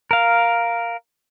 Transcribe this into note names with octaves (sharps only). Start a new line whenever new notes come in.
A#4 F5